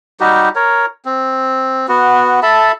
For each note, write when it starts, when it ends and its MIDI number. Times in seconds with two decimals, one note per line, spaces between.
0.20 0.49 55
0.20 0.49 63
0.20 0.49 66
0.20 0.49 67
0.55 0.86 70
0.55 0.86 73
1.05 1.87 60
1.88 2.40 59
1.88 2.40 66
2.43 2.72 69
2.43 2.72 76
2.43 2.72 81
2.43 2.72 83